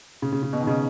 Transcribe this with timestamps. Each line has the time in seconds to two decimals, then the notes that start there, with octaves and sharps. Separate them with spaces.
0.22 C#3
0.32 C#3
0.43 C#3
0.53 B2
0.61 D#3
0.67 C#3